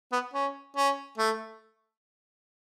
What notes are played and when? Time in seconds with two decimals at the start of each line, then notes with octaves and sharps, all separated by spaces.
0.12 B3
0.33 C#4
0.76 C#4
1.18 A3